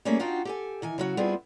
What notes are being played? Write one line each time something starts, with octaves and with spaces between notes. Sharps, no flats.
G3 A3 A#3 C#4 E4 G#4
D4 D#4 F4 F#4 G5
G4 A4 G#5
D#3 E3 G#5
C#3 F#3 F#4
G3 B3 C4 E4 F4 G#4